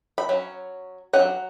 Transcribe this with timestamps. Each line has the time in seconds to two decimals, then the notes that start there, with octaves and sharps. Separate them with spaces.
0.18 B5
0.29 F#3 C#4
1.13 C#4 F#5
1.19 F#3